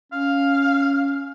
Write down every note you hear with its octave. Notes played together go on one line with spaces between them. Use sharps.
C#4 F5